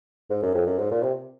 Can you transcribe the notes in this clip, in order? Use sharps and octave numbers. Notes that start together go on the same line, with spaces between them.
G#2
F#2
F2
F#2
G#2
A#2
C3